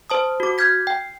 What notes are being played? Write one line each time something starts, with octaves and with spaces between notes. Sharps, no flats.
C5 A5 D#6
F#4 D6
F6 G6 G#6 B6
G5